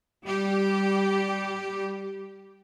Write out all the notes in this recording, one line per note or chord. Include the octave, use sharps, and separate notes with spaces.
G3 G4